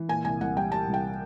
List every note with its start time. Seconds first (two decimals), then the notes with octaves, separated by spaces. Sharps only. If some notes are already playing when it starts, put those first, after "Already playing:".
Already playing: E3
0.09 A#2 G#5
0.25 C2 G#5
0.41 C2 F#5
0.57 G3 G5
0.72 G3 A5
0.88 C2
0.94 G5